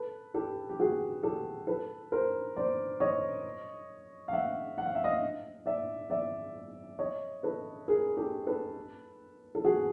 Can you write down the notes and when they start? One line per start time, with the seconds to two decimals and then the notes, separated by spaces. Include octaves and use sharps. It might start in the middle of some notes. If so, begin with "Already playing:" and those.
Already playing: A4 B4
0.34 G4 A4
0.69 G4
0.80 F#4 G#4
1.23 G4 A4
1.67 A4 B4
2.12 A#4 C5
2.56 C5 D5
3.00 C#5 D#5
4.28 F5
4.33 E5 F#5
4.78 F#5
4.86 F5
4.95 E5
5.04 D#5 F5
5.66 D5 E5
6.10 D5 E5
6.99 C#5 D#5
7.43 A4 B4
7.88 G#4 A#4
8.17 G4 A4
8.47 A4 B4
9.55 A4
9.64 F#4 G#4